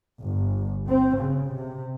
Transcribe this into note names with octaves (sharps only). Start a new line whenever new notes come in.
G1
C4
C#3
C3